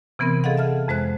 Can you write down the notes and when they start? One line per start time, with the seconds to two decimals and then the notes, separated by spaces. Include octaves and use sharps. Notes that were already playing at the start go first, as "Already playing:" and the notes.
0.19 C3 E3 B3 C4 A#4
0.44 G#4 A4 D#5 F5 F#5
0.57 E5 A5 F6
0.88 F2 G#3 C5 F#6